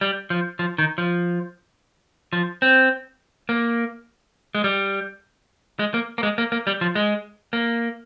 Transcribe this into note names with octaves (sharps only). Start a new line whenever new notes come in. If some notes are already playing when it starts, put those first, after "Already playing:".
G3
F3
F3
D#3
F3
F3
C4
A#3
G#3
G3
G#3
A#3
A#3
G#3
A#3
A#3
G3
F3
G#3
A#3